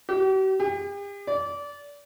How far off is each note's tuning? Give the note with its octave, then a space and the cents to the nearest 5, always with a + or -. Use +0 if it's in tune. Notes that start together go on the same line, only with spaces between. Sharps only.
G4 -45
G4 +45
D5 -25